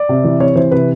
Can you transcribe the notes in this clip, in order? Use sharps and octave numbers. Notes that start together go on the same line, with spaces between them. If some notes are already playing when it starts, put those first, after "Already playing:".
Already playing: D5
C3
E3
C3 C#5
E3 C5
C3 B4